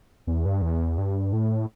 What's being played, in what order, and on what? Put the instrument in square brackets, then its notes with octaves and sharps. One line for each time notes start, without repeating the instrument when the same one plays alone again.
[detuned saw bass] E2
G2
E2
G2
A2